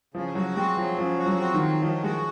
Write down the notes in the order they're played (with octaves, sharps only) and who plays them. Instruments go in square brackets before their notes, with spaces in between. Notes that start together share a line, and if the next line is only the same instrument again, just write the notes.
[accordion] C#3 [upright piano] F3
[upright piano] F#3 [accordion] F#4
[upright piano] G#3 [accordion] C4
[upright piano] F3 [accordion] F#3
[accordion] C#3 [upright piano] F3
[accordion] F#4
[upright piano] F#3
[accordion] C4
[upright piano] D#3
[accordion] F#3
[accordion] D#3 [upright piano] F3
[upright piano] G#3 [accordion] F#4